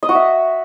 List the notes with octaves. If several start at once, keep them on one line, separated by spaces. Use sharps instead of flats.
D#5
F#4
E5